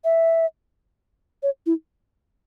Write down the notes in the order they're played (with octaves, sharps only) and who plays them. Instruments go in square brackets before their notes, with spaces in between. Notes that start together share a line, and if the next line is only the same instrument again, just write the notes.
[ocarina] E5
C#5
E4